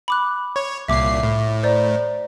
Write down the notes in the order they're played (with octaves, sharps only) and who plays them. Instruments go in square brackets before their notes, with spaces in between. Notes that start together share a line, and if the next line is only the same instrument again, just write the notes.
[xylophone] B5 D6 F#6
[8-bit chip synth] C#5
[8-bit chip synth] C2 A#2 C7 [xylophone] E5 D6
[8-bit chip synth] A2
[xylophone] C5 D5 A#5